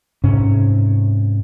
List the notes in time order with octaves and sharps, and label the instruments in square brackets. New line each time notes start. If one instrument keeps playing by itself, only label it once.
[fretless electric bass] G#2 C3 C#4